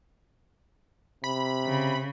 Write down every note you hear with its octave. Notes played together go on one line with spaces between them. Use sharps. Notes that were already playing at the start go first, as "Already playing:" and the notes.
C3 B5
C#3